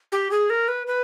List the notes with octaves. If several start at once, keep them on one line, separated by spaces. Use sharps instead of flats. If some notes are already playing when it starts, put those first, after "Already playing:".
G4
G#4
A#4
B4
B4